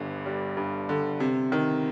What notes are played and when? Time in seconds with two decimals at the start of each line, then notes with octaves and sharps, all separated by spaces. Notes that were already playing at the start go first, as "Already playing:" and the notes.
Already playing: G1 G2 D3
0.26 G3
0.57 G2
0.89 D3
1.20 C3
1.52 D#3